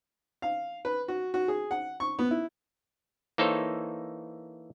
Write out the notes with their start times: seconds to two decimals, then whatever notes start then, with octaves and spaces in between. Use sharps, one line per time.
0.42 F5
0.85 B4
1.08 F#4
1.34 F#4
1.48 G#4
1.71 F#5
2.00 C#6
2.19 B3
2.31 E4
3.38 E3 A#3 D#4 A4 C5 C#5